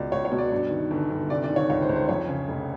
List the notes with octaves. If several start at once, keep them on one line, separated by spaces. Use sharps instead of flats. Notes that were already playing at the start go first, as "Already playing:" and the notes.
Already playing: C#2 B2 D5
C#2 C#5
C#5
B2
D5
G2
D#3
G1
G1
C3 D5
D5
D#3
C#5
C#2 C#5
C5
C#2
C5
F2 C#5
C#3
F1